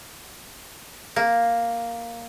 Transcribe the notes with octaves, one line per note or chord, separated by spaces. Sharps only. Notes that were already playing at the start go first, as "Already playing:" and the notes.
A#3